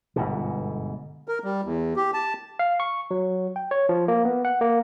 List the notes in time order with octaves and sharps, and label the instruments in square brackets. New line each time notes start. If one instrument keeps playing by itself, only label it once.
[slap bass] G1 G#2 B2
[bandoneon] A#4
G3
E2
G4
A5
[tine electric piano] F5
C#6
F#3
G5
C#5
F3
A#3
B3
F#5
A#3